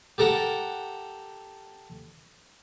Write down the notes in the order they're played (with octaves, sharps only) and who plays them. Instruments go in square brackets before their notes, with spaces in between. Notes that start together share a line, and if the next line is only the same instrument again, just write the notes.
[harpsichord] G4 A4 A#4 F#5